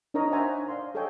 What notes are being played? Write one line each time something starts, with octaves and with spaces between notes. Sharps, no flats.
D4 D#4 A#4 C#5 D#5 A#5
C5 C#5 E5 F#5 G#5 A#5
D5 F5 C6
G#4 A4 C#5 D#5 G5 G#5